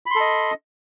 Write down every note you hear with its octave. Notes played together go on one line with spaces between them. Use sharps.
A4 D#5 B5 C6